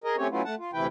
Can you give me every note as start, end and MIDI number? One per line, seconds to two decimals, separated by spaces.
0.04 0.16 68
0.04 0.16 70
0.04 0.16 75
0.17 0.27 57
0.17 0.27 60
0.17 0.27 61
0.17 0.27 67
0.17 0.27 73
0.30 0.42 54
0.30 0.42 57
0.30 0.42 59
0.30 0.42 61
0.30 0.42 64
0.30 0.42 65
0.45 0.55 57
0.45 0.55 78
0.45 0.55 81
0.58 0.71 65
0.73 0.87 38
0.73 0.87 48
0.73 0.87 52
0.73 0.87 64
0.73 0.87 71
0.73 0.87 79